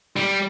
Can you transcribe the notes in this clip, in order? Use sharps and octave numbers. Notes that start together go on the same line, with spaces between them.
G3